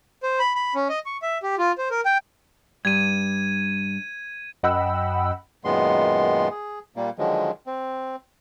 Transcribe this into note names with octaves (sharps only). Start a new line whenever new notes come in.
C5
B5
B5
C#4
D#5
C#6
E5
G4
F4
C5
A#4
G5
G2 G#6 D#7
F#2 D#5 F#5 G5 B5 E6
F#2 A#2 D#3 G#3 B3 C6
G#4
A#2 G3 A#3
D3 D#3 F3 F#3 G#3
C4